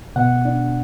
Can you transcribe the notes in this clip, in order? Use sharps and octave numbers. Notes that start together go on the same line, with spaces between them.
B2 F#5
D4